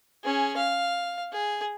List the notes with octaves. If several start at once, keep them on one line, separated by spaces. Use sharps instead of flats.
C#4 G#4
F5
G#4